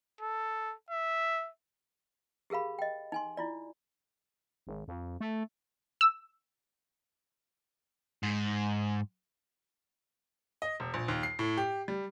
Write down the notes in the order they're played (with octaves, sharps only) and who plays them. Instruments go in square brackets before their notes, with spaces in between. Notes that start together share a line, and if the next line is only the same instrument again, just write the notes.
[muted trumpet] A4
E5
[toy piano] G4 G#4 A#4 F5 B5
D#5 G5
D#4 G#5 C6
E4 F4 D5
[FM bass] G#1
F2
A3
[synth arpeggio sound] E6
[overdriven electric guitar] G#2
[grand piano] D#5
E1
A#1
D#2
C7
A2
G4
G3